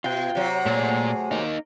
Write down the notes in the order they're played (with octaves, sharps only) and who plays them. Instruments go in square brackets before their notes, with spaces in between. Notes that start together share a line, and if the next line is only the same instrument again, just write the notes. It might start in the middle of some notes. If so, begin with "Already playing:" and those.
[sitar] B2 [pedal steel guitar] F4 G5
[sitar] C3 F#3
[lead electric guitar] A#2 [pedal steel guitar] A3 G#4
[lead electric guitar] A#3 D#4